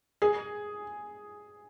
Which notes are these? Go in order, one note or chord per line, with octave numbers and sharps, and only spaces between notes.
G#4